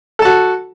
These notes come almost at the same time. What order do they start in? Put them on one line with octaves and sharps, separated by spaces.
A4 A5 F#4